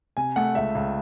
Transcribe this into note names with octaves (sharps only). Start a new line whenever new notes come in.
C3 G#5
A3 F#5
C#2 E5
C#2